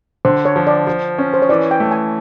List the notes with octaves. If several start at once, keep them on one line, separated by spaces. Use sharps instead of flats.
D3 C5
C#5
F3
D5
F3
C#4
C5
C#5
E3 D5
G5
A3
G#5